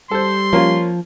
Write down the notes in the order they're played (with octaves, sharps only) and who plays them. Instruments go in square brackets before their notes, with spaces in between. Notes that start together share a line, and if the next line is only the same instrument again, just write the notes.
[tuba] G3 [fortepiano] A4 C5 [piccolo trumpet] C6
[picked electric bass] F3 [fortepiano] A#3 C#4 F4